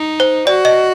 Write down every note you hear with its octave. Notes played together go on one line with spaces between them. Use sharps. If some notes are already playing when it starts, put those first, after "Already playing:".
Already playing: D#4
C5
F#4 D5
D#5